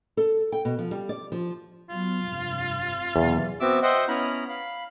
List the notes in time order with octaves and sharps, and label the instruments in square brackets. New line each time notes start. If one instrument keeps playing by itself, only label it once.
[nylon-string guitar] A4
G5
B2
F3
G3
D5
F3
[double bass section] F#3 B3 [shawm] F4
[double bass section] F1 G2 C3
[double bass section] B1 C3 [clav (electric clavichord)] E2
[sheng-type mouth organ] B3 C4 F#4 E5 D6 E6
C5 D#5 E5 F#5 G5
B3 C#4 E4 A#5 B5 F6
F5 B5